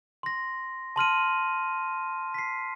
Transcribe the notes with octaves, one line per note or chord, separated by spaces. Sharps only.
C6 A#6
A5 C6 F6 D#7
B6 C7